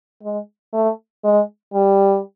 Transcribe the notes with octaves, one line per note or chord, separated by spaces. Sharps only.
G#3
A3
G#3
G3